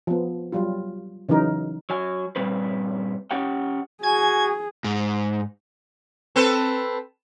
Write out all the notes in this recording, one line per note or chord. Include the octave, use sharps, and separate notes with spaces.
F3 B3
F#3 G3 F4
C#3 E3 F#3 D#4 A#4
F#3 G#5
G2 A#2 G3 C4 B4
C#4 G4 F#5 G5
F#4 G#4 G#5 G#6
G#2
C4 A4 B4